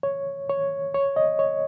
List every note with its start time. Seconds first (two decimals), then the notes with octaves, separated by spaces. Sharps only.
0.03 C#5
0.49 C#5
0.94 C#5
1.16 D#5
1.39 C#5